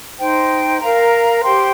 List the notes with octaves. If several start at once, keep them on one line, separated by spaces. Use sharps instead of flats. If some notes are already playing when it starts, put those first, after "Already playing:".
D#4 C5 G5
A#4 F5 A#5
G4 C5 G5 C6